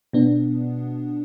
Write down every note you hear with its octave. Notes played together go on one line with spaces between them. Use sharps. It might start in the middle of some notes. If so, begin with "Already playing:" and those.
B2 B3 D4